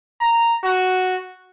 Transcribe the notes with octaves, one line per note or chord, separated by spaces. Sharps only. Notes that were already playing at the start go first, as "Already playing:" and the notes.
A#5
F#4